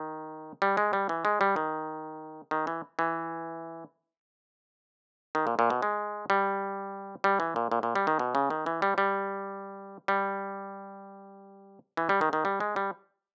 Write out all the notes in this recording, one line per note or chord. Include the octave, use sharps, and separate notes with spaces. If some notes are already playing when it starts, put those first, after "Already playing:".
Already playing: D#3
G3
G#3
G3
E3
G#3
G3
D#3
D#3
E3
E3
D#3
A#2
A#2
B2
G#3
G3
G3
E3
A#2
A#2
A#2
G3
D#3
B2
C#3
D#3
E3
G3
G3
G3
E3
G3
D#3
D#3
G3
G#3
G3